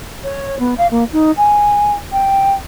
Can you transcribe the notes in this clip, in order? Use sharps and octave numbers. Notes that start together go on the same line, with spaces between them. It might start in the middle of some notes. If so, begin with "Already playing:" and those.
C#5
B3
F5
A#3
D#4
G#5
G5